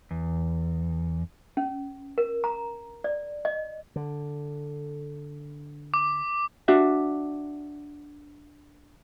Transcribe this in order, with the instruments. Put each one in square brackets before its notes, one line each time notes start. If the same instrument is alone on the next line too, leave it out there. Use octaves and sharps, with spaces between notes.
[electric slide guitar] E2
[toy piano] C#4
A#4
A#5
D5
D#5
[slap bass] D3
[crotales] D6
[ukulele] D4 F#4 E5